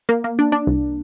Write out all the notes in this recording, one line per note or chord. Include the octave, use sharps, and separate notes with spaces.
A#3
A#3
D4
D4
C2